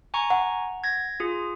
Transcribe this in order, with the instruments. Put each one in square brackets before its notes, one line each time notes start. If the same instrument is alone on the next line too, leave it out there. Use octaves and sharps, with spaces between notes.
[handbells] G#5 A#5 C#6
[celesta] F#5
[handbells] G#6 A#6
F4 G#4